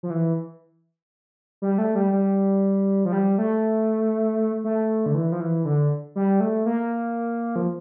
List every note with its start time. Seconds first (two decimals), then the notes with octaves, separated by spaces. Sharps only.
0.03 F3
0.10 E3
1.62 G3
1.78 A3
1.95 G3
2.12 G3
3.05 F3
3.12 G3
3.38 A3
4.64 A3
5.06 D3
5.14 E3
5.32 F3
5.40 E3
5.65 D3
6.16 G3
6.40 A3
6.66 A#3
7.56 F3